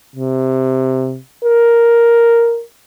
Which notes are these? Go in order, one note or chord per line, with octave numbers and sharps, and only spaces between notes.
C3
A#4